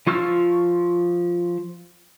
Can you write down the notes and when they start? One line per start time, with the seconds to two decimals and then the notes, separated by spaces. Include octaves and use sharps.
0.07 F3 F4 C#6 E6 F6